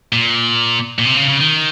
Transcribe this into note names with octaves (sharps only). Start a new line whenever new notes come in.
A#2
A#2
C3
C#3
C#3
D#3